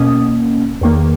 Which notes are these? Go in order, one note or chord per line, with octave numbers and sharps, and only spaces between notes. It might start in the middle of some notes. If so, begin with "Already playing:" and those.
Already playing: B2 A#3 C#4 D#6
E2 D#3 A#3